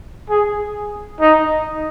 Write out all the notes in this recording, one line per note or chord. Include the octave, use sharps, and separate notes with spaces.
G#4
D#4